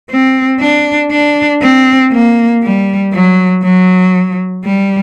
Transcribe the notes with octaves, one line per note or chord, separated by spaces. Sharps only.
C4
D4
D4
C4
A#3
G3
F#3
F#3
G3